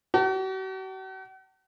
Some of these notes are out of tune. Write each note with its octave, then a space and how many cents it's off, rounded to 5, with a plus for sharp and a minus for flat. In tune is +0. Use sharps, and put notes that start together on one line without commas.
F#4 +45 A5 +30